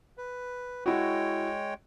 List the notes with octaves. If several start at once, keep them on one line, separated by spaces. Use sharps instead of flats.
B4
G#3 E4 F#4 C#5 G5